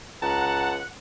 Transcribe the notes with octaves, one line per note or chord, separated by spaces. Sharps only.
C#2 F#5 A5 A#5